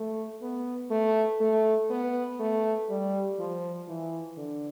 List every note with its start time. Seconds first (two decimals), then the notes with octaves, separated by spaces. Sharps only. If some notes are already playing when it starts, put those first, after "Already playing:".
Already playing: A3
0.42 B3
0.91 A3
1.41 A3
1.90 B3
2.40 A3
2.90 G3
3.39 F3
3.88 E3
4.37 D3